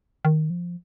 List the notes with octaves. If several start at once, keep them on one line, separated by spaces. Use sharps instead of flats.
D#3
F3